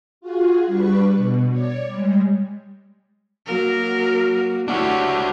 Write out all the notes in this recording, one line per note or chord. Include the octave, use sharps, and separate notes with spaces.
F4 F#4 G#4
G3 D4 B4 C#6
B2
C#5 D5
G3 G#3
F#3 A#3 F#4 A#4
A3 D4 E4 F#4 G4 C#5